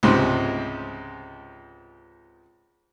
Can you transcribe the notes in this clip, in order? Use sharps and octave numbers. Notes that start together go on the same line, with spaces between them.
C#2 G#2 C3